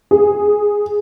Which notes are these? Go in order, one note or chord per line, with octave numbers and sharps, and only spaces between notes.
G#4